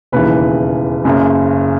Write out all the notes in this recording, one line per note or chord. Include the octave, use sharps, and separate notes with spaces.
E1 D#2 C#3 E3 B4
F#1 F#2 C#3